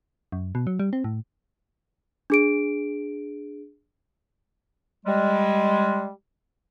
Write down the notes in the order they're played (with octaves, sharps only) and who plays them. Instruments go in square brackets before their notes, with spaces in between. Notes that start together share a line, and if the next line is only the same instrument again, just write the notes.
[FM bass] F#2
B2
F#3
G3
C4
A2
[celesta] D4 G#4 D7
[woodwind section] G3 G#3